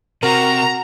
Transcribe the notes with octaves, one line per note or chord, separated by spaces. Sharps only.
C3 C4 F#4 A#4 A#5